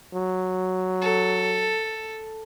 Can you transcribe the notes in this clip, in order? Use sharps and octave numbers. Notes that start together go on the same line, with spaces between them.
F#3
A4